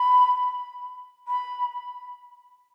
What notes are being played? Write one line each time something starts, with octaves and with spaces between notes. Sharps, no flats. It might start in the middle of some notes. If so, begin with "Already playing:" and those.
Already playing: B5
B5